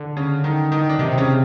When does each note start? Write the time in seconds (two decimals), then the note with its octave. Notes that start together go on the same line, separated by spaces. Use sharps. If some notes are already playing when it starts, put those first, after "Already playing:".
Already playing: D3
0.17 C#3 C#4
0.44 D#3 D#4
0.72 D#3 D#4
0.89 D4
0.99 C3 D#3 D#4
1.18 C#3 C#4